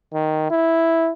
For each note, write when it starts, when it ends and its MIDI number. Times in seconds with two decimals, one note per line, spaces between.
0.14 0.47 51
0.50 1.11 64